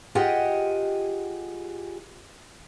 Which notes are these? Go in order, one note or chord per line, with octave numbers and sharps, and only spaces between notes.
F4 G4 G#4 D#5 F#5 G5